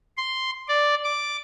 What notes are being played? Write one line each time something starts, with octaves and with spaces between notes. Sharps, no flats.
C6
D5
D6